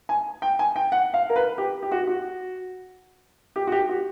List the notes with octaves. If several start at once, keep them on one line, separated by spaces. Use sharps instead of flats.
G#5
G5
G#5
G5
F#5
F5
A#4
B4
G4
G4
F#4
F#4
G4
F#4
G4
F#4